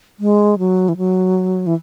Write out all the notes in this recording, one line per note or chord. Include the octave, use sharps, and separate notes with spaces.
G#3
F#3
E3
F#3
E3